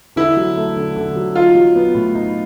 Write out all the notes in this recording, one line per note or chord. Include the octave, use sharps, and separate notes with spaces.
D3 E4
F#3
A3
D3
D3
F#3
D#4 F4
F#3
B3
A2
D#4